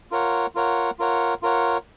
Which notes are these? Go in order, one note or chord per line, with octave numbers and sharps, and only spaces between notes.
F4 A#4 C#5 F#5
F4 A#4 C#5 F#5
F4 A#4 C#5 F#5
F4 A#4 C#5 F#5